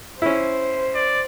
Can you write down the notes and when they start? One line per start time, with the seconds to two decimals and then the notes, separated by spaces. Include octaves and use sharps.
0.22 C#4 E4 C5
0.95 D5